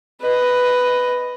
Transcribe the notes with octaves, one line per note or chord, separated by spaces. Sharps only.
B4 D#5